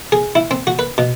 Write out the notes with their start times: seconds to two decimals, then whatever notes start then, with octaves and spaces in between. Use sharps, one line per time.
0.12 G#4
0.35 E4
0.51 C4
0.67 F#4
0.79 B4
0.98 B2